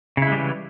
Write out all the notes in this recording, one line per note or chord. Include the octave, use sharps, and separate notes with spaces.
C#3 E3 G3 G#3 E4